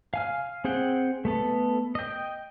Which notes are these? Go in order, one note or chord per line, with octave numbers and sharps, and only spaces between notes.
F5 G#5 F6
C4 G#4 F#5 G5
A3 B3 A4
D#5 G5